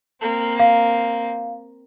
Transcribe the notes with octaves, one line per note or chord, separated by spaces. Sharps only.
A#3 C4
F5